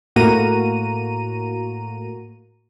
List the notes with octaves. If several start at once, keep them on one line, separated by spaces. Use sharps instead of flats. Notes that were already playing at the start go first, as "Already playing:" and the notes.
A2 A#3 F#4 A#5 D#7